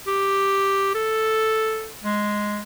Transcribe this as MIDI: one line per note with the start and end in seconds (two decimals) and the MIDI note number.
0.07 0.92 67
0.95 1.91 69
2.04 2.61 56